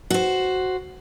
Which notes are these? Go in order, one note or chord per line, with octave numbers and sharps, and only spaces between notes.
F#4 C5